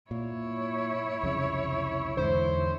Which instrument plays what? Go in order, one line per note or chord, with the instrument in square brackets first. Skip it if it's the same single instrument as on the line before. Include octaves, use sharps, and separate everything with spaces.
[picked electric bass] A#2 [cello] E4 C#5
[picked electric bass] C2 F2 C#3
[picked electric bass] E2 G#2 D3 [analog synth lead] C5